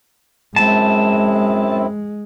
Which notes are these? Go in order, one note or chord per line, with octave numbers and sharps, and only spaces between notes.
F#2 G#3 C4 E4 A5